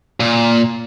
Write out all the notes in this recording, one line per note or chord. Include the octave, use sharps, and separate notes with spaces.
A#2